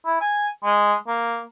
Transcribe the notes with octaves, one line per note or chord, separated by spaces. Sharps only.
E4
G#5
G#3
A#3